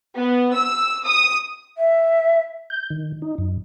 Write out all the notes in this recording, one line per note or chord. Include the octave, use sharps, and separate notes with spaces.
B3
E6
D#6
E5
G6
D#3
D#4
F#2